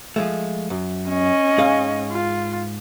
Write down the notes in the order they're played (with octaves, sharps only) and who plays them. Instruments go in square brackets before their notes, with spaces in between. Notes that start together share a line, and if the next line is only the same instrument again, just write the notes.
[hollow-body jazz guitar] F3 G#3 A3
F#2
[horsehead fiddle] C#4 D#5
[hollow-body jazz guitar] G#2 G#4 F5
[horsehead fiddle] F4